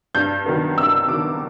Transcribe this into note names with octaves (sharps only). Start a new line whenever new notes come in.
G2 G6
D#3 F#3 B3
G2 E6
D#3 F#3 B3 D6